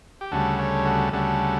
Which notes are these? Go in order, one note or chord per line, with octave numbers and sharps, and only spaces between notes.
G4
D2 C#3 G3 F#4 A4
A4 C#5
F#4 A4
D2 C#3 G3 F#4 A4